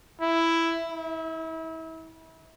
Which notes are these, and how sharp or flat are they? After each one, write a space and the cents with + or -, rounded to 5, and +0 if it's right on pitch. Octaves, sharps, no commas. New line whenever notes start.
E4 +5
E4 -35